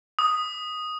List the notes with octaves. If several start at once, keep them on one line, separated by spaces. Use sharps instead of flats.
D#6